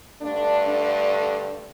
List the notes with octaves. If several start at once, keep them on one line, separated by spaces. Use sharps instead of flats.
G2 D3 A3 D4
D4